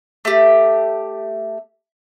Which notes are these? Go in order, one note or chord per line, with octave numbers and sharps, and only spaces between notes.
A3 G4